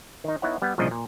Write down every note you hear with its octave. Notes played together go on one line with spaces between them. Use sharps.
D#3 D#4
B3 D#4 E4 C#5 F#5
G3 B3
C2 A#2 C#3 F3 D4 D#5
A#2